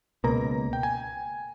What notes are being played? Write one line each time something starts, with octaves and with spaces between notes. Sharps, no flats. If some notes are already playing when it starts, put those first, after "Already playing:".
C#2 B2 A#3 A#5
G5
G#5